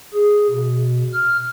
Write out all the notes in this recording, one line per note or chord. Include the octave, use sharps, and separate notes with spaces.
G#4
B2
F6